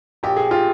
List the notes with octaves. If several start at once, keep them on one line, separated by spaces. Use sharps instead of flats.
A#1 G4
G#4
F4 G4